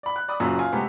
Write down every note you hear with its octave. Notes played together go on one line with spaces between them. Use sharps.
D5 B5
F#6
D5 B5 D#6
F#1 F#2 A#2
F4 G#5
C3 G#3 A3 B3 G4